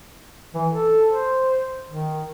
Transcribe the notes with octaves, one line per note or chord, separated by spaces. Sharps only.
E3
A4
C5
D#3